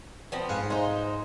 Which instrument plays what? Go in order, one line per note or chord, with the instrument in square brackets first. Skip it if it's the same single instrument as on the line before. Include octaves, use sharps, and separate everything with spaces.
[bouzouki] F3 B3 C4
[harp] G#2 [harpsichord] F5 F#5 G#5
[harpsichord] G#3 [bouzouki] D#4 C5